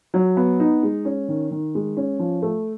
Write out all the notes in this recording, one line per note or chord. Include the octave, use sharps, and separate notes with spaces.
F#3
B3
D#4
G#3
C#4
D#3
D#3
G#3
C#4
F3
A3